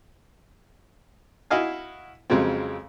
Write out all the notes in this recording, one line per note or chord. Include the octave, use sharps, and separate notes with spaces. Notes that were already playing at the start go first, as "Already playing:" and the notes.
E4 F#4 D#5 F5 G#5
F2 C#3 F#3 G#3 C4